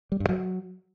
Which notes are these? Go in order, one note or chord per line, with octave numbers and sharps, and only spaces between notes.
G3
G2
F#3